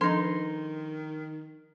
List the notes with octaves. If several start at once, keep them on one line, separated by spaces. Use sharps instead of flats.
D#3 F3 D4 D#4 A4 C6